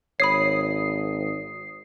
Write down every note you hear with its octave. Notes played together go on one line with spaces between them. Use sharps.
G#1 C#5 B5 D#6 C7